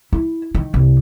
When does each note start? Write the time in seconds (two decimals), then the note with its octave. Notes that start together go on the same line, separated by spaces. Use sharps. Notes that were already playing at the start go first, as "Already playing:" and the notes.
0.12 E4
0.55 D#3
0.74 C2